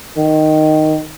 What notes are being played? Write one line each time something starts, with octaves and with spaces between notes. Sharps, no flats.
D#3